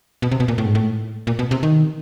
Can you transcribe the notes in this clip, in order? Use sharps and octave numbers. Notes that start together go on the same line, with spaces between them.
B2
C3
B2
A#2
A2
G#2
A2
A#2
B2
C3
D#3